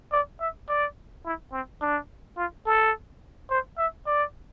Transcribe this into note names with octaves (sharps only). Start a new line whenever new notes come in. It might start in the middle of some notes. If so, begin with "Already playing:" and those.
D5
E5
D5
E4
C4
D4
F4
A4
C5
E5
D5